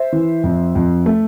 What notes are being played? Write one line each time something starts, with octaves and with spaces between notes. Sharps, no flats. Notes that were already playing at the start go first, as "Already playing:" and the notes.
Already playing: C5 E5
E3
F2
F2
A3